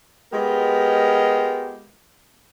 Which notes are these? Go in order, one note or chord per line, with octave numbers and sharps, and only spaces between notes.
G#3 B3 F4 G4 A#4